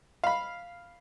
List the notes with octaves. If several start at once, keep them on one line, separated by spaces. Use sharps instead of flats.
F5 B5